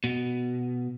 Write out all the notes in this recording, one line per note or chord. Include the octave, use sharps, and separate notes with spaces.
B2